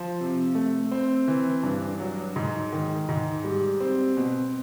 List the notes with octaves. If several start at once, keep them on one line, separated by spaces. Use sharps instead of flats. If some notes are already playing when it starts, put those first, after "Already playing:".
Already playing: F3
C3
A3
C4
E3
G2
F#3
G#2
D#3
G#2
G3
C4
B2